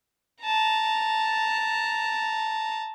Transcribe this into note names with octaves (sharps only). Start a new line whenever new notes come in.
A5 A#5